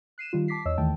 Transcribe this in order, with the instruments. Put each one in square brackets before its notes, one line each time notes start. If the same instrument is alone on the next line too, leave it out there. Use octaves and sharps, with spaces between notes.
[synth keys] F#6 C7 D#7 E7
D#3 G3 F4
A5 D6 B6 C7
E2 C#5 D#5 E6
D#2 D#3 E3 A3 G5 A5